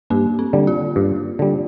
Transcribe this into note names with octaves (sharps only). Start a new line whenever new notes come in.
G2 A#3
C4
D3 G3
F4
G2
D3 G3